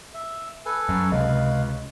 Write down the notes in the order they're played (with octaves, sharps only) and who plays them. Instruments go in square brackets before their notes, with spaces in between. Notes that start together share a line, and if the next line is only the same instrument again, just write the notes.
[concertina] E5
A4 B4 G#5
[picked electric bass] F#2
[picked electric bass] C#2 [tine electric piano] C3 D#5 [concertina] B4 F5 B5